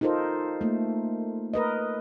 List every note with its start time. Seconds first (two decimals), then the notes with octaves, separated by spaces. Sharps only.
0.01 D#4 F4 A4 A#4 C5
0.61 A3 A#3
1.54 A#4 B4 D#5